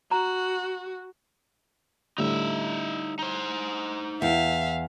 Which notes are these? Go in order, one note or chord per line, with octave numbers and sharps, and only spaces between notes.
F#4 A#5
A2 D3 G3 D#4 E5
D#4 C5
E2 E5 F5